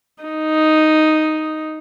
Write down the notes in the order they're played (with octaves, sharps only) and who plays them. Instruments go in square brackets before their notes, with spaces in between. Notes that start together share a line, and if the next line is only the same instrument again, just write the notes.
[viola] D#4